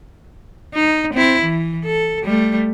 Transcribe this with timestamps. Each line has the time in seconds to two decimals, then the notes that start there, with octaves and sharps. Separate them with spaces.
0.74 D#4
1.13 C4 E4
1.42 E3
1.85 A4
2.23 G3 A3